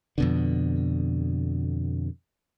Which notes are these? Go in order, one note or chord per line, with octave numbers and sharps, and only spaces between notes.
F2 B2 D3